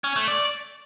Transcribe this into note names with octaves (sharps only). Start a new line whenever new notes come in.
C#4
A3
D5